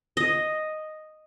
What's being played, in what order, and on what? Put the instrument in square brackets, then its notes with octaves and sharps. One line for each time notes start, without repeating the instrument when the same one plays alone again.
[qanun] D#5